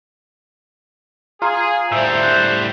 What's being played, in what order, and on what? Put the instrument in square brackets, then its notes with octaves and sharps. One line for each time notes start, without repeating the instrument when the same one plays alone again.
[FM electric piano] F4 [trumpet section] G#4 [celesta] A#5
[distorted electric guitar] A2 G3 [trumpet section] C5 [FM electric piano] E5
[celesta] F#6